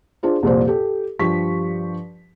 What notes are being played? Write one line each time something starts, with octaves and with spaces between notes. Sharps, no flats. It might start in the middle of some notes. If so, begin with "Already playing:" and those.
D4 F4 G#4 C5
C2 F2 A#2 C5
G4 A4
G2 F3 G4 C#6 B6